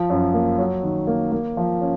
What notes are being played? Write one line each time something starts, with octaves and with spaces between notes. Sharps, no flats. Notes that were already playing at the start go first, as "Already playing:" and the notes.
Already playing: F3
F#2
A#3
F#3
D#3
A#3
A#3
F3
C#4